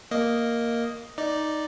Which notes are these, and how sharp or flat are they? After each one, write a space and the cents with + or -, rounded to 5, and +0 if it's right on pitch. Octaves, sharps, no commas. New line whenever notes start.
A#3 +0 D#5 +0
D#4 +0 D5 +0